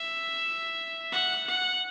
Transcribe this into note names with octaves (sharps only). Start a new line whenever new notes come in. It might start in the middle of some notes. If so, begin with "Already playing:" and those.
Already playing: E5
F#5
F#5